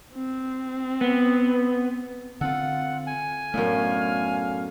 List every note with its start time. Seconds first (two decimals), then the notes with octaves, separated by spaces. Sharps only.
0.15 C4
1.01 B3
2.41 D3 C4 F4 A4 F#5
3.07 G#5
3.54 F#2 A2 D3 A3 B3 F5 F6